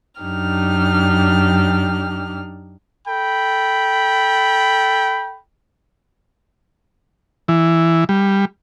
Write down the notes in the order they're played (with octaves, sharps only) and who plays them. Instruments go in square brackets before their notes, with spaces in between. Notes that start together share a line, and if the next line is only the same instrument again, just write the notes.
[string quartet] F#2 D4 D#4 G4 F6
[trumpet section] A4 G5 B5
[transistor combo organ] E3
G3